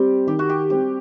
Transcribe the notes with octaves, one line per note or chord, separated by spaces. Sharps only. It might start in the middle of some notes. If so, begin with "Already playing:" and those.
Already playing: G3 C4 G4
D#3 G4
F#4
G4
G3 C4 G4